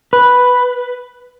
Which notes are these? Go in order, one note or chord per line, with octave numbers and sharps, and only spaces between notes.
B4